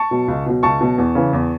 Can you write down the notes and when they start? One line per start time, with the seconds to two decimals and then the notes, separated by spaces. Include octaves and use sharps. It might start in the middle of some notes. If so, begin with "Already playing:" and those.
Already playing: A5 C#6
0.11 B2 F#3
0.28 C#2
0.46 B2 F#3
0.63 C#2 A5 C#6
0.81 B2 F#3
0.98 E2
1.15 C#3 E3
1.33 E2